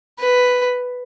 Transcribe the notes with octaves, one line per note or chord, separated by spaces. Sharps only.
B4